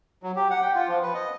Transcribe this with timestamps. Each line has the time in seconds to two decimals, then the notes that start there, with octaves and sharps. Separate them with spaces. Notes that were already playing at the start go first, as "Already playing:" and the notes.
0.23 F#3
0.36 G4
0.50 F#5
0.62 G5
0.75 F4
0.88 F3
1.03 B4
1.14 D#5